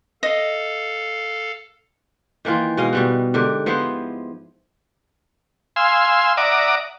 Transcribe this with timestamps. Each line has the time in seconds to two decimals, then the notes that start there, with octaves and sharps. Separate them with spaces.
0.23 A4 D#5 F5
2.45 D#3 E3 A#3 F4
2.77 B2 G#3 D#5 F5
2.93 B2 G3 B3
3.34 G#2 D3 G4 A#4
3.66 F3 B3 E4 C5
5.76 F5 G#5 C6 E6
6.37 D5 E5 F#5 A#5 D6 D#6